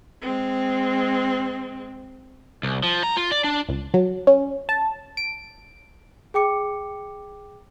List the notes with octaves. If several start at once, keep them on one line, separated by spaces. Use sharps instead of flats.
G#3 C4
C2
F3
A#5
F4
D5
D4
C#2
F#3
C#4
A5
D7
G#4 G5 D6 C#7